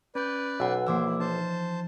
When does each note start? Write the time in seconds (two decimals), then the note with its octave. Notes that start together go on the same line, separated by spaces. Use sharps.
0.15 C#4 B4 D5 G6
0.60 B1 F#5 E6
0.87 E3 F3 A#3 C5 D6 E6
1.06 E4
1.20 D#4 C5 A5